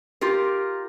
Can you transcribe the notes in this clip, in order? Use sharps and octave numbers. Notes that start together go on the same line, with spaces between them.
F4 G4 A#4